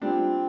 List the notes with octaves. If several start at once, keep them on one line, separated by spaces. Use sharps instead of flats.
A#2 G3 C4 D4